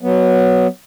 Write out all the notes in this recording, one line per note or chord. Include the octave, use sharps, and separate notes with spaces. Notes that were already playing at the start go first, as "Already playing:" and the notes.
F#3 B3